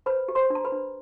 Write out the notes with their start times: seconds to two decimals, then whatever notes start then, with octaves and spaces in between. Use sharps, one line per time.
0.06 B4 C5 B5
0.28 G4
0.35 C5 C6
0.50 D4
0.55 A#5
0.65 B4 B5
0.72 D4